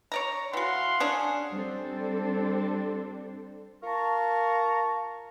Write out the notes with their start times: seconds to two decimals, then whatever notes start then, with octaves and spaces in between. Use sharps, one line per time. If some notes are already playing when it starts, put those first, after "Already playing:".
0.12 C#5 D5 A#5
0.53 E3 F#4 F5 F#5 C6
1.00 C#4 D4 G#4
1.51 G3 C4 D4 A4 C5
3.83 F4 A#4 A5 A#5 C#6